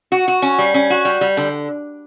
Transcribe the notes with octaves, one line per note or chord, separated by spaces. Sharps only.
F#4
F#4
C#4
G3
C#4
F#4
G3
G3
D3